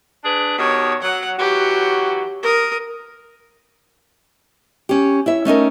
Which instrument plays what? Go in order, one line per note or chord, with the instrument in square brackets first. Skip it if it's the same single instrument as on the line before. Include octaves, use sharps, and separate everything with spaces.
[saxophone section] D4 G#4 B4
[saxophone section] B2 D#3 G4 [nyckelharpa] C#5
[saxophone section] F#3 [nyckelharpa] F#5
[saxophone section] E3 F#3 F#4 [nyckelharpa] G4
[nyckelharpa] A#4 D#6
[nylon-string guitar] C#4 G4
E4 C#5 E5
A3 C#4 D#4 A#4